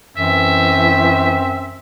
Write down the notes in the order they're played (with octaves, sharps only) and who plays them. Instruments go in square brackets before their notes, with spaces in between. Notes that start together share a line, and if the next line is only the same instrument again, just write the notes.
[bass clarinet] F#2 [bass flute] E3 [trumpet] C4 [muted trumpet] E5